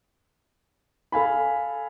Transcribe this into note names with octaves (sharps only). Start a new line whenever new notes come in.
A4 F5 G#5 B5